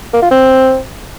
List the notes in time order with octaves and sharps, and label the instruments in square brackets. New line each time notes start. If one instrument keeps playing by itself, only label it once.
[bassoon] A#3
F4
C4